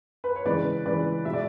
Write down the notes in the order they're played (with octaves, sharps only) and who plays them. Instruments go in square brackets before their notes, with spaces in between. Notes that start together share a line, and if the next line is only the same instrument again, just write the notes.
[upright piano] B4
C#5
C#3 E3 G#3 B4 D5
C#3 E3 G#3 B4 D5
B2 G#3 E5
D5